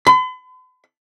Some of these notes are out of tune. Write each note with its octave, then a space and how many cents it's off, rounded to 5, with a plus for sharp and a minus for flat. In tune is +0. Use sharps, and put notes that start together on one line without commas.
B5 +45